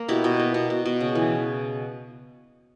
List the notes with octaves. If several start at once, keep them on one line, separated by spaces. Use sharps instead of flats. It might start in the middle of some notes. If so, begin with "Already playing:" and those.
Already playing: A#3
B2 E4 G4
B2
A#3
B2
B2
B2
C#3
E3